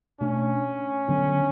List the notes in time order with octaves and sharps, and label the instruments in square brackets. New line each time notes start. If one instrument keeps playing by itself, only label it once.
[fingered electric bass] B2 A3 D4 [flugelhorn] C#4
[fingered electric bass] D3 F#3 B3 D4